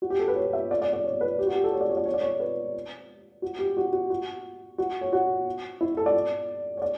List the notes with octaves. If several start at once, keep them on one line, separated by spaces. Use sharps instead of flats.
F#4
G4
A4
B4
C#5
E5
D5
D5
D5
C#5
B4
G4
F#4
G4
A4
C#5
D5
C#5
D5
C#5
D5
C#5
B4
F#4
G4
F#4
F#4
F#4
F#4
C#5
F#4
E4
A4
D5
C#5
D5